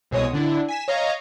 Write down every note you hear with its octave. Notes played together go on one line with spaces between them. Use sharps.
C2 B2 G#3 C#5 D#6
D3 D4 E4
G#5 B6 E7
C#5 D#5 F5 A#5